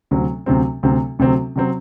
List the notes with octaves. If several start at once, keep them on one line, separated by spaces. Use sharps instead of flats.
D2 C3 F#3 C4
D2 C3 F#3 C4
D2 C3 F#3 C4
D2 C3 F#3 C4
C3 F#3 C4